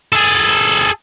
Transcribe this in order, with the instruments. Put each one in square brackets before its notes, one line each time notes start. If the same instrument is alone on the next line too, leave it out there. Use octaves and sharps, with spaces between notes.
[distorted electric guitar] G#4 A4